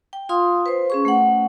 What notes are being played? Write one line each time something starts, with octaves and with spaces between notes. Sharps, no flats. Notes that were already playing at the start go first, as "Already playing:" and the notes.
G5
F4 F5 C6 D#6
B4 C5
C#4 G#4 C#6
A3 F#5